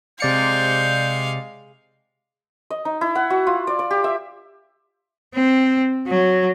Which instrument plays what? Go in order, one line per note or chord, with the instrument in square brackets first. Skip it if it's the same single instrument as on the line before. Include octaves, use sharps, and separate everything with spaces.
[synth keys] C3 D5 C#7 [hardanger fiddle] G#3 F5 [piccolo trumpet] G6
[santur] D#5
D#4
E4
F#5
F#4
F4
D5
D5
G4
E5
[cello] C4
F#3